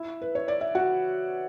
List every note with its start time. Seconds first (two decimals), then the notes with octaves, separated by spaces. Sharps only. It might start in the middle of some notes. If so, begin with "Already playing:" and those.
Already playing: E4 E5
0.22 B4
0.35 C#5
0.48 D5
0.61 E5
0.75 F#4 F#5